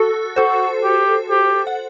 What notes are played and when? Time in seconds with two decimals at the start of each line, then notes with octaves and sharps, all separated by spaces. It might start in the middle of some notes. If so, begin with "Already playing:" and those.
Already playing: F#4 A4
0.36 F#4 A4 C5
0.83 G4
1.30 G4
1.67 F#5